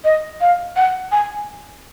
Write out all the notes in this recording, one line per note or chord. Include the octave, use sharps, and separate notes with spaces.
D#5
F5
F#5
G#5